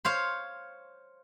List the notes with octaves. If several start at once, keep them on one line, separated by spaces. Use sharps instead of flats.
C5 C#5 F5